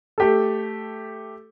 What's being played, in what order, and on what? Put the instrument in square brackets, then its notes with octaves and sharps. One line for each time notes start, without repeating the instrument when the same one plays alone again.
[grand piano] A3 G4 A4